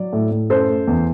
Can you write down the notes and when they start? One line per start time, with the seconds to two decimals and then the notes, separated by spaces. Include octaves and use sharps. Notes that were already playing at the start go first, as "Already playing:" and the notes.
Already playing: F#3 D5
0.13 A2
0.31 A2
0.49 F#2 A4 C5
0.69 A3
0.87 E2